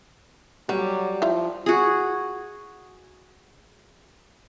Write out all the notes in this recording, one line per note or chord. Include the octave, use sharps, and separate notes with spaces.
F#3 G3 F#4 G4
F3 E4 F4
F#4 G#4